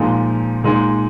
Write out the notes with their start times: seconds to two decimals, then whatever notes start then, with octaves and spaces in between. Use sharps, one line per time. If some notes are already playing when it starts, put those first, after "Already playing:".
Already playing: A#2 F3 G#3 D#4
0.64 A#2 G#3 D#4